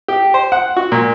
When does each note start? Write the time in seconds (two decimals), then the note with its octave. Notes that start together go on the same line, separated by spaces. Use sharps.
0.08 G4
0.34 C5
0.52 F#5
0.77 F#4
0.92 A#2